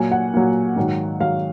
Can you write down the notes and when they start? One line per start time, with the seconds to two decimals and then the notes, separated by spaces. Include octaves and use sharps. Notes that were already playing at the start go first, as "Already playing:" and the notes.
Already playing: A#2 F#3 G#5
0.11 F#5
0.34 A#2 F#3
0.76 G#2 D#3 F#3
1.20 G#2 D#3 F#3 F5